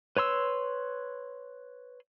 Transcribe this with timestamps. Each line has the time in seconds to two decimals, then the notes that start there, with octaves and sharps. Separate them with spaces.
0.17 B4 C#5 C6 E6